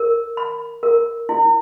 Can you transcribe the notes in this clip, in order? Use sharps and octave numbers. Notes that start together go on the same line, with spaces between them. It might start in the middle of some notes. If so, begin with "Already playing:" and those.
Already playing: A#4
B5
A#4
E4